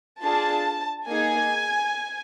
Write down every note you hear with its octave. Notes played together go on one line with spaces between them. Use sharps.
D4 F4 G#4 A5
A#3 D#4 G#4 G#5